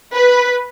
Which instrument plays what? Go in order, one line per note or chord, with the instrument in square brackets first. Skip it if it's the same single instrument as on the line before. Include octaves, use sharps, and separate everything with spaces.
[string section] B4